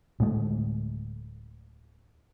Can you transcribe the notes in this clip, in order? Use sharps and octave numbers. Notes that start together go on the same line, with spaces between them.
D1 A2 G#3 A3